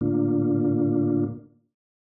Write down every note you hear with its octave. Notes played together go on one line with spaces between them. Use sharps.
A2 D3 A#3 D4 F4